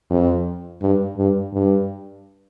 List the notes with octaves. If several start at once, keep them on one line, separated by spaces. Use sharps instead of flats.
F2
G2
G2
G2